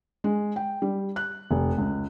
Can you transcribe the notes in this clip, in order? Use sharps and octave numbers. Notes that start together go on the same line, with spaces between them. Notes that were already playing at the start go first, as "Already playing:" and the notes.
G#3
G5
G3
F#6
F1
C#2